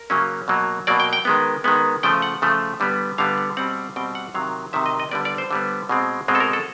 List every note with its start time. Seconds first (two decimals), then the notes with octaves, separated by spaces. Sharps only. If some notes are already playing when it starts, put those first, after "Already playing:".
Already playing: A#4
0.10 C#3 F#3 A#3 C#4
0.48 B2 F#3 A#3
0.87 B2 F#3 A#3 D5
1.00 G5
1.13 G5
1.25 D#3 G#3 B3
1.64 D#3 G#3 B3
2.03 C#3 F3 A3 G5
2.22 F#5
2.42 C#3 F3 A3
2.80 D3 G3 B3
3.18 D3 G3 B3 F5
3.38 F#5
3.57 B2 G3 C4 F#5
3.96 B2 G3 C4 G5
4.15 F#5
4.34 C3 D#3 F#3 F5
4.73 C3 D#3 F#3 E5
4.86 D#5
5.00 D#5
5.11 D3 G3 B3 D5
5.25 D5
5.38 C5
5.51 D3 G3 B3
5.89 B2 G#3 C4
6.28 B2 G#3 C4
6.35 A4
6.40 A#4
6.53 A4